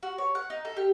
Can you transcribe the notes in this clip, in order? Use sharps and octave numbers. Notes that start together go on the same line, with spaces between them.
F#4
C#5
F#5
D#4
A4
G4